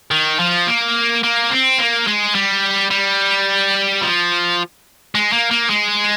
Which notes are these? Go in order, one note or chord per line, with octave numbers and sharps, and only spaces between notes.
D#3
F3
A#3
A#3
C4
A#3
G#3
G3
G3
F3
G#3
A#3
A#3
G#3